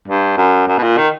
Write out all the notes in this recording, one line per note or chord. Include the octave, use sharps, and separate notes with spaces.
G2
F#2
F#2
B2
A#2
D#3